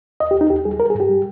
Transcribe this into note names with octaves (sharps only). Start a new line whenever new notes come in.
D#2 D#5
G4
D#2
D#4
D#2 G4
G3 G#4
G3 A#4
G#4
G2
G4
G3